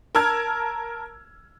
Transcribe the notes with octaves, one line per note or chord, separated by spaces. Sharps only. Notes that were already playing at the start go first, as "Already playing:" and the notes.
A#4 A5 E6 F6 G#6